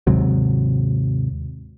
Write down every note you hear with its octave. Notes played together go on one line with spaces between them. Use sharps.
D#2 G#2 C3 F#3